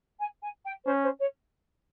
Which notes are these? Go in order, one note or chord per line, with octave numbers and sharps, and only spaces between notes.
G#5
G#5
G5
C#4 C5
C5
C#5